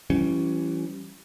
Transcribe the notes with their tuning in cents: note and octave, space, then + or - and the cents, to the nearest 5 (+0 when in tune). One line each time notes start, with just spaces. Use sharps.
E3 +20 G3 -20 C#4 +0